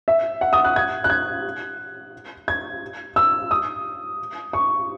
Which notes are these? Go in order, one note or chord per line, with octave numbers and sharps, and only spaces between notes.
E5
F#5
D#6
F#6
G#6
F#6
G#6
G#6
E6
D#6
C#6